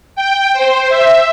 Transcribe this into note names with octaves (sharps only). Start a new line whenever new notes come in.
G5
C5
E5